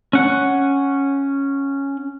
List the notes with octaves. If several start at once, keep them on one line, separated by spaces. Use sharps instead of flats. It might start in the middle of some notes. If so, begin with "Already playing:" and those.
C#4 F#5